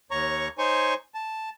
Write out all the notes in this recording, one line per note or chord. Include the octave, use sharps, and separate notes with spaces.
D#2 C#5 A#5 C#6
D#4 C5 C#5 G#5 C#6
A5